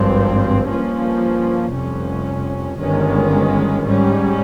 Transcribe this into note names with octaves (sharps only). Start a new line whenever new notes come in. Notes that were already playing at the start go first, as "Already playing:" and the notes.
Already playing: G#1 G2 F3 C4
G2 F3 A#3 C#4
F1 F2 C3 G3 C#4
G1 G2 D#3 G#3 C#4
G#2 G3 C#4